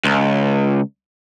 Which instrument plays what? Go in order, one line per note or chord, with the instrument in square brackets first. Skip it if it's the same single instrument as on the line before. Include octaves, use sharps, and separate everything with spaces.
[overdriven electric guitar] C#2